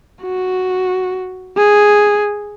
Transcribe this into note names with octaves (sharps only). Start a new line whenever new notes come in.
F#4
G#4